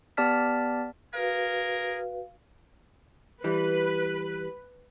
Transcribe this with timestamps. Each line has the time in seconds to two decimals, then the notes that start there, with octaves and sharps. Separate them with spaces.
0.17 B3 G4 D5 A5 F6 B6
1.13 F#4 G#4 A#4 B4 F5
3.44 E3 G3 B4